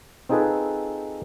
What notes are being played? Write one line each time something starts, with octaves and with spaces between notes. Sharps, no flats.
C4 D#4 F4 G#4 A4 B4